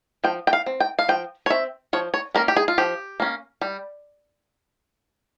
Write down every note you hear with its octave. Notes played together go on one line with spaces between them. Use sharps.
F3 G5
G5
F5
C4
G5
F5
F3 G5
C#5
C4 E5
F3 C#5
C#5
A#3 C#4 A#4
G4
G#4
F4
F3 G4
A#3 C#4
G3